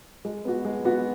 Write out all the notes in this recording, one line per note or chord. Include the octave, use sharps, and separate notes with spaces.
G#3
B3 F#4
G#3
B3 F#4